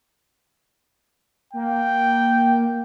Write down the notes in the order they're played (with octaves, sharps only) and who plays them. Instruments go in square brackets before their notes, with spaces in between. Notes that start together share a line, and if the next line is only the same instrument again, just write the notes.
[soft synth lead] A#3 [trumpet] G5